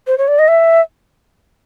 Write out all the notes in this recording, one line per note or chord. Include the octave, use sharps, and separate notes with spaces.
C5
C#5
D5
D#5
E5